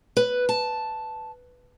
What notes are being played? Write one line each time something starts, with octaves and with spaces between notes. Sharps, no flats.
B4
A5